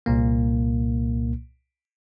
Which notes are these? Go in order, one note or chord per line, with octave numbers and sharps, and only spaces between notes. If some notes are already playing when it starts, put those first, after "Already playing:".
C2 A#2 A#3